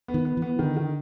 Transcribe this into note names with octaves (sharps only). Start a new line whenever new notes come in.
B3
D#3
B3
E3
B3
D3 D#3
D#3